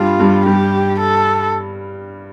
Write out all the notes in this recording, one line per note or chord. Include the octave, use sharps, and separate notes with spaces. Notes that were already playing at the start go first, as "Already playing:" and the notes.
Already playing: G2 G3 F4
G2 G3
G2 G3 G4
A4